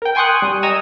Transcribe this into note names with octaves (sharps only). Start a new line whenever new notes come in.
A#4 G5
G5 G#5 C6 C#6 D#6 F#6
G3
D#5 G#5 A#5 C#6 E6 D#7